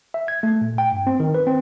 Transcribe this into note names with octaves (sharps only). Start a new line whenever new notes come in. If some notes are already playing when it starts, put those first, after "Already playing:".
E5
G#6
A3
A#2
G5
G2
C4
D#3
B4
C4